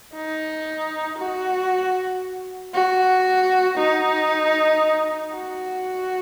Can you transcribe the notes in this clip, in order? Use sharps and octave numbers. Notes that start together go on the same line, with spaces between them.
D#4
F#4
F#4
D#4
F#4